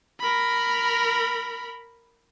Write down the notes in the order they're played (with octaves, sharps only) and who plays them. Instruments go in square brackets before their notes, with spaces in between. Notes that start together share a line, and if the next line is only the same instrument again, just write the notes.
[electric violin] A#4 B5